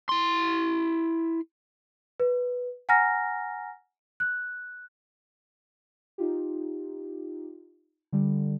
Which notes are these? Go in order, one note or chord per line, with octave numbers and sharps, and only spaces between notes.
E4 C6
B4
F#5 G#5 A#5 F6 A#6
F#6
D#4 F4 G4
D3 G3